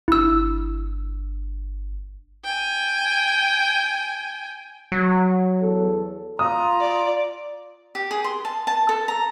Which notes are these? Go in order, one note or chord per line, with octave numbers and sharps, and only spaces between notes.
G1 E4 E6
G5 G#5
F#3
E2 A4
F4 A#5 D#6
D5
G4
G#4
C6
A5
A5
A4
A#5